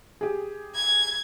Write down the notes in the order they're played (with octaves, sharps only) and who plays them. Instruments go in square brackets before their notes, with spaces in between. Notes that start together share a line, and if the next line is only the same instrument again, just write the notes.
[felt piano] G4 G#4
[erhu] G#6